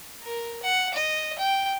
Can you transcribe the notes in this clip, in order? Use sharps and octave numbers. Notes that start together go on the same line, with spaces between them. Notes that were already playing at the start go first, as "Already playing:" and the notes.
A#4
F#5
D#5
G5